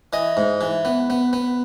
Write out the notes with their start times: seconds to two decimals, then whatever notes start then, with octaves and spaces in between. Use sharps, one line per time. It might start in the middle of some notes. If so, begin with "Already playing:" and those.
0.13 E3 D#5
0.37 G#2
0.61 E3
0.85 B3
1.10 B3
1.33 B3